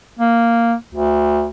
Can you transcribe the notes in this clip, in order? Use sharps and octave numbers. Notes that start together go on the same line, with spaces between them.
A#3
D2